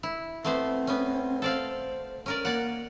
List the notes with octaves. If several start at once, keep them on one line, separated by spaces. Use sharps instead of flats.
E4
A3 B3 C4 C5
B3 C#4
A4 C5 D5 F5
C#4 A#4 D5
A#3 D5 F#5